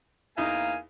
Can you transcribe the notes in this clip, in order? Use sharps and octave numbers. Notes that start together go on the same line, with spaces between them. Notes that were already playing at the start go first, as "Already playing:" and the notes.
E2 A#3 D#4 F5 G#5